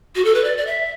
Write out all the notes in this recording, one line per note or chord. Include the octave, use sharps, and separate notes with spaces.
F#4
A4
B4
D5
D5
E5